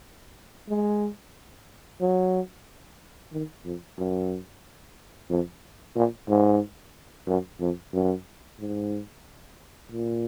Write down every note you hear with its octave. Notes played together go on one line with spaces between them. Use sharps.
G#3
F#3
D#3
F2
F#2
F2
A#2
G#2
F#2
F2
F#2
G#2
A#2